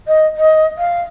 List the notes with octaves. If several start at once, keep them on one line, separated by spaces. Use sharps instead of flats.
D#5
D#5
F5